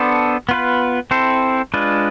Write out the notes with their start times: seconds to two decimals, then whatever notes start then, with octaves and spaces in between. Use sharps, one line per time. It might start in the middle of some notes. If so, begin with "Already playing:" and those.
Already playing: B3 D4 A4 C5
0.49 B3 F4 B4
1.11 C4 E4 A4 C5
1.74 G#3 D4 F4 B4